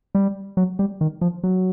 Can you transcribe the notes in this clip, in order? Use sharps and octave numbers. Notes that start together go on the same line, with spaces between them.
G3
F#3
G3
D#3
F3
F#3